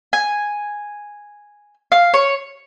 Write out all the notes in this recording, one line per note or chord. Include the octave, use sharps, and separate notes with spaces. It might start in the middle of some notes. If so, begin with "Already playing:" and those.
G#5
F5
C#5